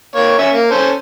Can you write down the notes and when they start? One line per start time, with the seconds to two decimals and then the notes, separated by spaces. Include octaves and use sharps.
0.16 A#3 C#5
0.39 C#4 E5
0.54 A#3
0.71 C#4 A4 C5